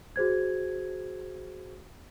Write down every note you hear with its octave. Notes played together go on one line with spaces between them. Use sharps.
F#4 G#4 C5 G#6